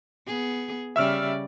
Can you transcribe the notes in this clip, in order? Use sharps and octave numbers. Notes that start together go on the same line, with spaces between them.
B3 G#4
C#3 G3 D5 E5 E6 F6